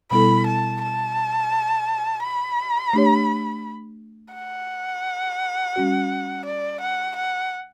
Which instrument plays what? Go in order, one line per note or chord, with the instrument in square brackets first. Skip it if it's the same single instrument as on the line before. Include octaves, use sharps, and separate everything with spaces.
[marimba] B2 G3 B3 E4 A4 [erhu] B5
[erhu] A5
A5
B5
[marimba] A3 D4 G4 C#5
[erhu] F#5
[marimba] G3 C#4 F#4
[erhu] D5
F#5
F#5